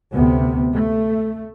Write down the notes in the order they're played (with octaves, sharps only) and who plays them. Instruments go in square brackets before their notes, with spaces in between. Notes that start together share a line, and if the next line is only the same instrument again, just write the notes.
[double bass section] D2 C3 B3
A3